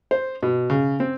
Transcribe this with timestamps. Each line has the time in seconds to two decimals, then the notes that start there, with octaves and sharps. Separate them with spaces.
0.11 C5
0.43 B2
0.70 C#3
1.00 C4